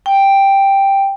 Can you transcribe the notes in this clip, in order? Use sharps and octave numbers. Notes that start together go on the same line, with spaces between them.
G5